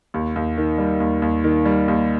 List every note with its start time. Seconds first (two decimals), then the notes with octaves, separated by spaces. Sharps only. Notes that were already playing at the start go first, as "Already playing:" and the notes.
0.14 D#2
0.36 D#2
0.58 D#3
0.78 G3
1.00 D#2
1.22 D#2
1.44 D#3
1.66 G3
1.88 D#2